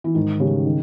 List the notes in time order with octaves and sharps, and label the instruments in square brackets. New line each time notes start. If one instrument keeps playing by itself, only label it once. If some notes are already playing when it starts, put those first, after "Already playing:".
[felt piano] E3
[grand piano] G#2 [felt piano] D#3
[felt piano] C#3 [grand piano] G3 C#4 G4
[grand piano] D#3